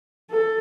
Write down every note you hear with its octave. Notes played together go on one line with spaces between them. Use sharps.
A4